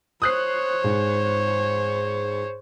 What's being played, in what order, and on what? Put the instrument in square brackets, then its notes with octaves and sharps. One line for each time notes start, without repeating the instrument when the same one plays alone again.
[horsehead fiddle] C5 C#5 [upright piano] D#6 F#6 C7
[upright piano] G#2